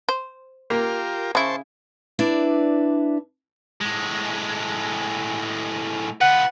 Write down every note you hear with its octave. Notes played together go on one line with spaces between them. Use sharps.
C5
A#3 F4 G4 A#4
C#3 E4 C5 A5 C#6
D4 E4 B4 D5
A2 G#3
F4 B4 F#5